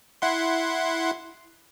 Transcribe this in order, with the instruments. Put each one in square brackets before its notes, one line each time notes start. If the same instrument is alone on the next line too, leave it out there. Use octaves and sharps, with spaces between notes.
[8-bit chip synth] E4 F#5 C6